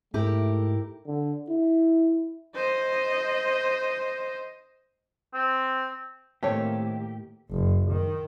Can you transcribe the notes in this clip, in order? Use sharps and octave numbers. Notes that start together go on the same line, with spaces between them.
G#2 A3 E4 G4 A#4
D3
E4
C5 D#5
C4
A2 D#3 A3 A#3 C4 G4 C#5
F#1
D#3